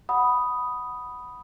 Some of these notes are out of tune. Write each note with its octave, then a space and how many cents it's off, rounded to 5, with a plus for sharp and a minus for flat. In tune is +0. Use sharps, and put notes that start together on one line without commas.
F#5 +0 B5 +0 D#6 +0